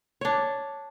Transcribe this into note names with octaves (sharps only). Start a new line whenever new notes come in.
D4 C#5